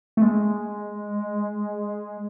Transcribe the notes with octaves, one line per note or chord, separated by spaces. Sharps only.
A3
G#3